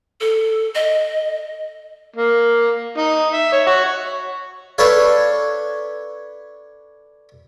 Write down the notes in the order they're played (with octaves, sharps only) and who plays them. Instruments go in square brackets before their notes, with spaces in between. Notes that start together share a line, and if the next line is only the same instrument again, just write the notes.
[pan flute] A4
D#5
[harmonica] A#3
D#4
E5
C#5
F#4
[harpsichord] D4 A4 B4 C#5 F5